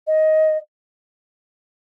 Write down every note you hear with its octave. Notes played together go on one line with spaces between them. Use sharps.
D#5